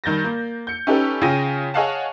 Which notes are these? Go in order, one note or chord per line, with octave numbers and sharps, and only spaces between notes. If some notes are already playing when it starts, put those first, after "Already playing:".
G2 D#3 G6 A6 A#6
A#3
G6 C#7
C#4 D#4 G4 A4 B4
C#3 F4 G5 A#6 D#7
G#4 C#5 D#5 F5 F#5 A5